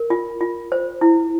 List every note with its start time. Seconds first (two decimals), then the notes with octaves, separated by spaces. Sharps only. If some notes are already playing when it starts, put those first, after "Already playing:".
Already playing: A#4
0.10 F4
0.41 F4
0.72 C5
1.01 E4